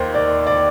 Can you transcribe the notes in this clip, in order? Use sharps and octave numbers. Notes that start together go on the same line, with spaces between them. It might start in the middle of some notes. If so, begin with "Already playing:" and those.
Already playing: D#2 D#3 A#3 C5
D5
D5